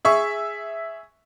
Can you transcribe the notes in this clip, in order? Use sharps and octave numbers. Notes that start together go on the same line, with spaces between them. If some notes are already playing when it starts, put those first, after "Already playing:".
G#4 E5 C#6